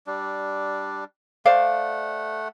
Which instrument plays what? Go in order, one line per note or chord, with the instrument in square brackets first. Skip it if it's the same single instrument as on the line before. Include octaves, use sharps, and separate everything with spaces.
[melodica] G3 D4
[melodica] A3 F#5 [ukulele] C5 D5 F5